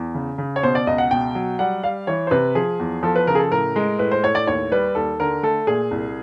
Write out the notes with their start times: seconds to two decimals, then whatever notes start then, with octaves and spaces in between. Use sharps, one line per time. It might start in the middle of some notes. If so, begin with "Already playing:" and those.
Already playing: E2
0.15 C#3
0.38 C#3
0.56 C#5
0.63 B2 C5
0.75 D5
0.87 C#2 D#5
0.98 F#5
1.11 B2 G5
1.35 F#3
1.59 G3 F#5
1.83 G3 F5
2.07 E3 C#5
2.27 C5
2.31 C3 B4
2.55 F3 G#4
2.79 E2
3.03 F3 A4
3.16 B4
3.27 C#3 A#4
3.35 G#4
3.39 A4
3.51 A2 A#4
3.76 G#3
3.99 A2 B4
4.12 C5
4.23 A2 C#5
4.35 D5
4.47 D#2 C#5
4.72 G3 B4
4.95 D#2 A4
5.20 D3 A#4
5.43 A3 A4
5.67 A#2 G#4
5.91 C2